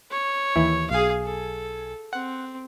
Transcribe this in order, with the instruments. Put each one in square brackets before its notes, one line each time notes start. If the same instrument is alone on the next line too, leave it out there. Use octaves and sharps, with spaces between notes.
[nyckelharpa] C#5
[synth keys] D#2 E3 E4
[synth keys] B1 G#5 [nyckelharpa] G#4 F5
[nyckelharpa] A4
[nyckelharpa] C4 [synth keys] F#5